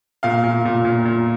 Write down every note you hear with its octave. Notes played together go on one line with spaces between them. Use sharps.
A#2 F5
A#2
A#2
A#2
A#2